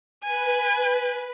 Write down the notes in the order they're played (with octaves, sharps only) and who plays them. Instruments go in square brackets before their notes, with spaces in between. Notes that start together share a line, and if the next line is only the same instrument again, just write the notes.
[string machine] B4 [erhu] G#5